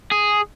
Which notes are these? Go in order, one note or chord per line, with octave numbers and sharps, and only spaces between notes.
G#4